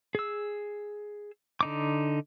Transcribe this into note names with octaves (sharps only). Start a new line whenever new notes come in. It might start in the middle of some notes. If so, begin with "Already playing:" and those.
G#4 E6
D3 D#4 D6